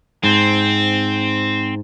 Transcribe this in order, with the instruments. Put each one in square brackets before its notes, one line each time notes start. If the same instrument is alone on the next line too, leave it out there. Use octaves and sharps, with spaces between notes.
[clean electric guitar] G#2 C5 [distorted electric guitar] C4